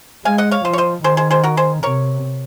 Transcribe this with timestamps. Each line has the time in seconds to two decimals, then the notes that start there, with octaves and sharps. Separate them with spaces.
0.25 G#3 F5 G#5
0.38 D#5 F#5
0.51 C#5 F5
0.65 F3 C5 D#5
0.73 C#5
0.78 C5 D#5
1.04 D#3 G#4 C5
1.17 G#4 C5
1.31 G#4 C5
1.43 F#4 A#4
1.57 G#4 C5
1.83 C3 A#4 C#5